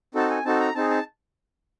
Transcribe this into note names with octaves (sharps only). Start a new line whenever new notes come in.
C4 D#4 F#4 A4 A5
G#5
C4 D#4 F#4 A4 A5
A#5
C4 D#4 G#4 A5
A5